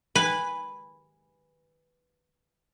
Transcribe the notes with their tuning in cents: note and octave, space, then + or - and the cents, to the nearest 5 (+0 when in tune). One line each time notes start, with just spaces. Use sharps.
B4 +0 G#5 -15